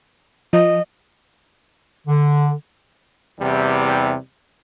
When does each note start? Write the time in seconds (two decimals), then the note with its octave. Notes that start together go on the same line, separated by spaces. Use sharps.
0.53 F3 D#5
2.07 D3
3.40 E2 C3 E3 G3